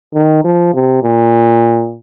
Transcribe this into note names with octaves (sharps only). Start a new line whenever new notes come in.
D#3
F3
C3
A#2